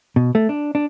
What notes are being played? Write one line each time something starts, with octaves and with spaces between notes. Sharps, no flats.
B2
A3
D4
D4